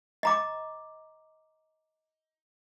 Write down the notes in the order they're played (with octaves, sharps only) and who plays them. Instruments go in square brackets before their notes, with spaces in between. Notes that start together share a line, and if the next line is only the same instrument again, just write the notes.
[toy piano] D#5 A#5 D6